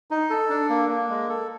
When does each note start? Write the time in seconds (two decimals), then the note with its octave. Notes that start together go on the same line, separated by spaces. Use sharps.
0.11 D#4
0.30 A4
0.50 D4
0.69 A#3
0.89 A#3
1.09 G#3
1.29 A4